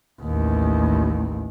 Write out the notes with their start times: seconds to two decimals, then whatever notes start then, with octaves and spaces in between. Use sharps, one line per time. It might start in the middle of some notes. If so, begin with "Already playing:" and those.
0.21 A1 D#2